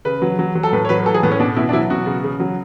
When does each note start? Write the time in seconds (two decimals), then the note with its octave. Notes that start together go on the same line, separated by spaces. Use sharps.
0.05 C#3 B4
0.22 F#3
0.39 F#3
0.55 F#3
0.63 A4
0.73 A2 B4
0.85 C#5
0.89 F#3 B4
1.06 E3 A4
1.14 G#4
1.23 A2 B3
1.31 C#4
1.39 B2 D4
1.56 B2 E4
1.69 D4
1.73 F#3 E4
1.90 B2 F#4
2.06 C#3
2.24 C#3
2.40 F#3